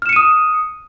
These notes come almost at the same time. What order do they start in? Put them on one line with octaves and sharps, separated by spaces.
F6 E7 C#7 D#7 D#6